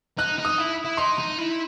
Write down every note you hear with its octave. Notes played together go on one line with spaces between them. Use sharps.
D#4 F#6
D#4
D#6
E4
E4
D#4 C6
D#4
E4